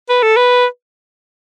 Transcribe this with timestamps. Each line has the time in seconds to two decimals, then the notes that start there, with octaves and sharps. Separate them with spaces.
0.09 B4
0.23 A4
0.37 B4